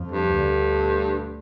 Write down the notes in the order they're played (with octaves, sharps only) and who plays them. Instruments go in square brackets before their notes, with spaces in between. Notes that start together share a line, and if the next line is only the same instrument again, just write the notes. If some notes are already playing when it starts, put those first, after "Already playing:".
Already playing: [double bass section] F2 F3
[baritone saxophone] G2
[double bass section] D2 D3